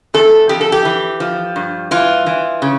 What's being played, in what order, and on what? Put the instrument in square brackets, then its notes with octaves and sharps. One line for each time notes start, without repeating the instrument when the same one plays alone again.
[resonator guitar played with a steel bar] E2 A4
F2 G4
A4
G4
E3
F3
G2
E3 F4
E3
C#3